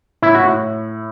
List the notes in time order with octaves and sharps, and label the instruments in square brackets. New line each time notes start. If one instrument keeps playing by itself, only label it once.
[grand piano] A2 [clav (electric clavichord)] E4
[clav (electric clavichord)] F#4
[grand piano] A2